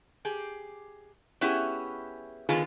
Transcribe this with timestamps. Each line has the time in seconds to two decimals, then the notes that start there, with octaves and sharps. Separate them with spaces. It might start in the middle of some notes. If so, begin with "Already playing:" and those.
0.25 G4 G#4
1.41 B3 C#4 E4 G4 G#4
2.49 D3 D#3 B3 F4 G#4